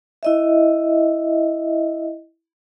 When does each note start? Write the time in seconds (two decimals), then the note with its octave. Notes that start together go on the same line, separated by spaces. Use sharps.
0.23 E4 D#5 E5